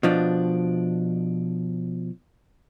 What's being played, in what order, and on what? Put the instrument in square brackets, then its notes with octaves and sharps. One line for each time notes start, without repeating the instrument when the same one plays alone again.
[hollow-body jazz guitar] B2 F3 D4